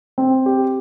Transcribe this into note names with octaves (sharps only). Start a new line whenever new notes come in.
C4
G4